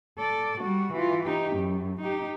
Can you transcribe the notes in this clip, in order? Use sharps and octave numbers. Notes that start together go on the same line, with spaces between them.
A4 D5
G3 F#4
E3 F4
D#4 G4
F#2
D#4 G4